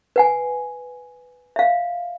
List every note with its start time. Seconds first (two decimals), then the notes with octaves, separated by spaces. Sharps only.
0.16 B4 F#5 G#5
1.56 E5 F5